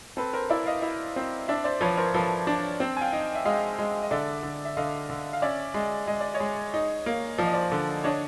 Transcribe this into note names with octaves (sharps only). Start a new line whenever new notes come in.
C4 A4 B4
A#4 C5
E4 D5 E5
D#5 F5
E4
C4
D4 D5 E5
C5 D5
F3 B4 C#5
A#4 C5
F3 A4 B4
D4
C4
G#5
F5 G5
D#4
E5
G#3 D#5 F5
G#3
D#5
D3 D5 E5
D3
E5
D3 D#5 F5
D3
F5
C#4 D5 E5
G#3
G#3 D#5
D5
C#5 D#5
G#3
D#4
A#3
F3 D5
D#5
C5 D5
D3
D4 C#5 D#5